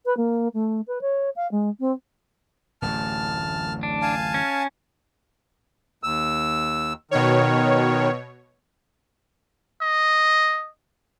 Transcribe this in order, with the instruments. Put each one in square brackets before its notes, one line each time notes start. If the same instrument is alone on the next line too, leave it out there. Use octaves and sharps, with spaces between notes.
[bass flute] B4
A#3
A3
B4
C#5
F5
G#3
C4
[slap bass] D1 A1 F#2 [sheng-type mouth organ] A5 F6
[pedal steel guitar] D4
[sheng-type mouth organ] F5 G#5 A5
[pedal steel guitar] C#4
[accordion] D#2 E6
[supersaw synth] B2 C#5 [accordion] D#3
[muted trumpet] D#5